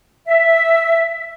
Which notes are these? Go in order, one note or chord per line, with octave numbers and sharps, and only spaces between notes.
E5